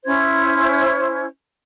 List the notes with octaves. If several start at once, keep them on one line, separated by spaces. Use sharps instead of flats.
C#4 E4 C5 G#6